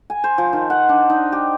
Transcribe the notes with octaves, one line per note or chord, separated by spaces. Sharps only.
G#5
C5
F3
D#3
F#5
D4
D#4
G4